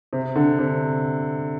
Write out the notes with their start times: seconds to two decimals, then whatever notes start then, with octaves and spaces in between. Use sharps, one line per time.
0.13 C3
0.35 D3
0.59 C3